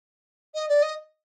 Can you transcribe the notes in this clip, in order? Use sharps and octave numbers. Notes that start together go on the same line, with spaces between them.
D#5
D5
D#5